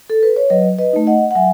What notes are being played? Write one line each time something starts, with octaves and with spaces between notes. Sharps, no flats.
A4
B4
C#5
F#3 B4 D#5
B4 D#5
A3 D#4
D#5 F#5
F#5
F#3 E5 G#5